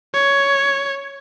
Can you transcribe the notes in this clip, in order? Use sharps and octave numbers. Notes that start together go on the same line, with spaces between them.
C#5